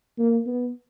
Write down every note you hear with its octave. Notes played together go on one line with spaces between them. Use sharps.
A#3
B3